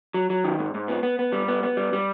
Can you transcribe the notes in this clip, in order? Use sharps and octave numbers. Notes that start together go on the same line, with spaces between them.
F#3
F#3
D#3
G#2
G#2
B3
B3
B3
G3
B3
B3
G3
G3